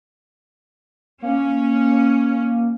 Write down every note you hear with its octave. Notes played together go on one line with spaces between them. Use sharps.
A#3 C#4